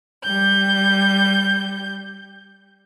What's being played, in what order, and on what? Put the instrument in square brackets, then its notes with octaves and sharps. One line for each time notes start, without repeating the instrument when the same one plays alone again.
[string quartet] G3 G6